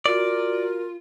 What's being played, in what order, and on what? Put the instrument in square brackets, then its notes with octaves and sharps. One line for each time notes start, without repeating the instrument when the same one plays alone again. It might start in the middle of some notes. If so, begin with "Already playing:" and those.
[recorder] F4 [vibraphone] F#4 [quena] A#4 [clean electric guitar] D5